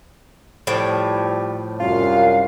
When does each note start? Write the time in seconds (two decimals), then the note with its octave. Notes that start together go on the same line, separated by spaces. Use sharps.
0.67 A2 F3 G3
1.80 C2 F#2 F4 F5